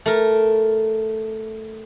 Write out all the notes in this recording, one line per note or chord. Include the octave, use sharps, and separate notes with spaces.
A3 A#4